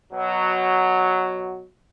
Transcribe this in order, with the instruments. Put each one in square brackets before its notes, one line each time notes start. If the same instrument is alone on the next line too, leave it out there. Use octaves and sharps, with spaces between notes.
[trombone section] B2 F#3